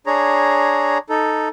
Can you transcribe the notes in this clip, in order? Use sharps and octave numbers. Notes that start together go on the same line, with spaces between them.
D4 G#4 C#5 A#5
D#4 A4